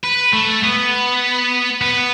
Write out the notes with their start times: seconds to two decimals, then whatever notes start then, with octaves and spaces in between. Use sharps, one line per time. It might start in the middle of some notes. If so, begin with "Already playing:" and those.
0.04 B4
0.33 A3
0.64 B3
1.81 B3